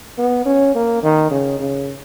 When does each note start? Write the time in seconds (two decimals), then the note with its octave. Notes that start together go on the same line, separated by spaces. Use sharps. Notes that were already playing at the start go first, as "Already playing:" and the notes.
0.18 B3
0.46 C#4
0.75 A#3
1.03 D#3
1.31 C#3
1.59 C#3